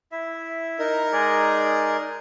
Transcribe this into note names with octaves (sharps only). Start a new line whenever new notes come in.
E4 E5
D#4 A#4
G#3 G#4 D5